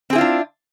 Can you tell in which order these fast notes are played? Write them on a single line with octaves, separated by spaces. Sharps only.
C4 G#4 E4 F4 D4